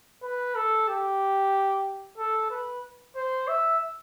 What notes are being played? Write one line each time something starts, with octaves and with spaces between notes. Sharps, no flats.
B4
A4
G4
A4
B4
C5
E5